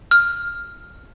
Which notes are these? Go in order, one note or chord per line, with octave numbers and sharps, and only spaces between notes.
F6